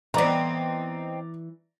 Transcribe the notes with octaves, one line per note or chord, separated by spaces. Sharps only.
E3 B3 C4 D#4 D5 A#5